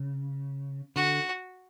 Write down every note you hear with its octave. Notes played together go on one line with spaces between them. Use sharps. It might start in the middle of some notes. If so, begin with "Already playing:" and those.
Already playing: C#3
D3 F#4